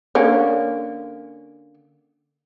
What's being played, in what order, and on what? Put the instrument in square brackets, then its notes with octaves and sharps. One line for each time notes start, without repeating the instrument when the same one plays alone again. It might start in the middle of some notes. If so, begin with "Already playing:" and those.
[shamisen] D3 A#3 C#4